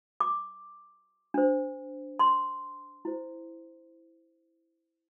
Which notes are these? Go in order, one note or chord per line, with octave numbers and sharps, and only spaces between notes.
D6
D4 C5
C6
E4 C5